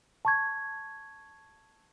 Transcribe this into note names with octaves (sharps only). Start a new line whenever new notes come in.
A5 C#6 G#6